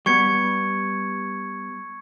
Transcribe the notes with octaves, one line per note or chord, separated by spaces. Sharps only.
G3 B3 C#6 G#6 C#7